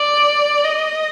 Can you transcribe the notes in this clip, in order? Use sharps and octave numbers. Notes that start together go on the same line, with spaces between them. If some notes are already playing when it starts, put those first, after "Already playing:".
Already playing: D5
D#5